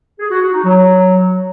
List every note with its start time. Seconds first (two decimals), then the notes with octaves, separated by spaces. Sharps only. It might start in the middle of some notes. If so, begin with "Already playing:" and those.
0.19 G#4
0.31 F#4
0.42 F#4
0.54 D#4
0.65 F#3